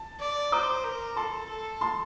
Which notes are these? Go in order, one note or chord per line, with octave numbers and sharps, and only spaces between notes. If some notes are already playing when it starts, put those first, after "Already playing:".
Already playing: A5
D5
C5 A#5 D6
A#4
A4 A5 C6
A4
A5 C6